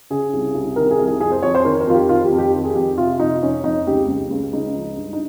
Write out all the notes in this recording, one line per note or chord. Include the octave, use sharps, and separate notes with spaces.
C#3 G#4
C2
C2
D#3 A#4
G#4
C2
G#4
F2 G#4
C5
F2 C#5
C5
D#3 A#4
A#4
F2 F4
G4
D#3 F4
G4
F2
G4
D#3
G#4
F2 G4
C3 F4
F2 D#4
F2 C#4
F2 D#4
C#2 G4
C#2
C#2
C#2 D#4
F3
G2
D#4